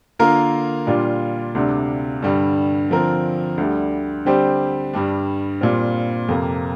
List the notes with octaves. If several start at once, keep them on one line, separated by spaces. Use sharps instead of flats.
D3 A#3 F4 A#4
A#2 G3 D4 F4
D2 C3 G3 D4
G2 D3 G3
D3 F3 C4 A#4
D2 D3 G3
D3 G3 C4 G4 C5
G2 G3 D4
A#2 G3 C4 F4
F2 C3 A#3